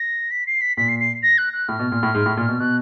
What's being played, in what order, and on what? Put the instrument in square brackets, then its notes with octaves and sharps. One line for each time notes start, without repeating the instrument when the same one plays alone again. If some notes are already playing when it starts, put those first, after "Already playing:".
Already playing: [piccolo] A#6
B6
C7
B6
[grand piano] A#2 [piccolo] B6
[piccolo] C7
C7
A#6
F#6
F#6
[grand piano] A2 [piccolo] F6
[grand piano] B2
A#2
A2
G#2
A2
A#2
B2
[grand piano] B2 [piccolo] F#6